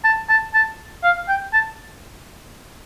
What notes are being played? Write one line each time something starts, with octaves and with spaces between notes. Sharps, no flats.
A5
A5
A5
F5
G5
A5